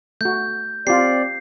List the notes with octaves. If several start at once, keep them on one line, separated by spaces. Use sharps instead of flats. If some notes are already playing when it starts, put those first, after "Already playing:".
A3 F#4 G6
C4 F4 G4 D5 C7